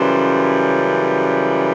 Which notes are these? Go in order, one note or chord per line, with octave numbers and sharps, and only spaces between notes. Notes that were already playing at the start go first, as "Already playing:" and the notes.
Already playing: F#2 C#3 E3 G3 C5